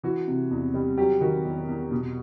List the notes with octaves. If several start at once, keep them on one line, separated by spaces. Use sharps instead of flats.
E3 F#4
C3
E2
G3
F#3 G4
D#3 F#4
E2
E2
B2